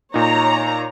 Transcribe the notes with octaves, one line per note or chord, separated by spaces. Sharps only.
A#2 D#4 C#5 A#5